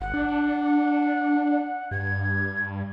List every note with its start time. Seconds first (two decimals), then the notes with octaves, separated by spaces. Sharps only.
0.01 G1 F#5
0.14 D4
1.91 G2 G#6